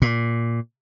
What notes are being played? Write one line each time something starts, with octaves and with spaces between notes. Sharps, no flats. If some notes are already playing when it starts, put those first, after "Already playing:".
A#2